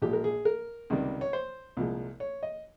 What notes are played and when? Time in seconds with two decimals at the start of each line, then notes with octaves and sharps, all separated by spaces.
0.02 A#1 A#2 F3 G#3 G4
0.13 A#4
0.24 G#4
0.45 A#4
0.90 C#2 C3 D#3 G3
1.21 C#5
1.33 C5
1.77 C2 A#2 F3 G#3
2.20 C#5
2.43 D#5